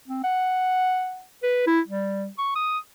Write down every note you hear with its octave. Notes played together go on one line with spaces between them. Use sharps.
C4
F#5
B4
E4
G3
C#6
D#6